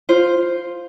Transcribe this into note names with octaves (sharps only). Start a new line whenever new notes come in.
F4 C5